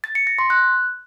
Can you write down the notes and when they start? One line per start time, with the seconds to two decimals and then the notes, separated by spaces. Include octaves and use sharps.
0.04 A6
0.15 C#7
0.27 A#6
0.39 C6
0.50 F#6